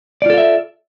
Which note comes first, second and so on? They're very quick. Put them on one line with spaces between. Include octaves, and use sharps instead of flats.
D5 F4 A4 F5 E5